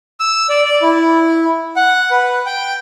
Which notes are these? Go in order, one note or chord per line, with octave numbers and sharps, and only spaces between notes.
E6
D5
D5
E4
F#5
B4
G5